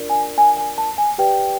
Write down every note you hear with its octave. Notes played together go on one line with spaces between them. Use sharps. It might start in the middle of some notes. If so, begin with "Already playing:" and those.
Already playing: D4 F4 A#4 D5
G#5
G#5
G#5
A5
G#5
G4 B4 D5 G5